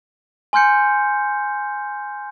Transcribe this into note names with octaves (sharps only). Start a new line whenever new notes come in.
G#5 C6 F6 G6 C#7